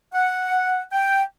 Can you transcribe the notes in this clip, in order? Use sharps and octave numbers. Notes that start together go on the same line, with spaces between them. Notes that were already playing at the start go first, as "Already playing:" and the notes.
F#5
G5